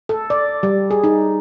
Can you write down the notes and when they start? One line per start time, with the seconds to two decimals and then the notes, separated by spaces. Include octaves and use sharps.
0.09 A4
0.30 D5
0.63 G3
0.91 G#4
1.04 D#4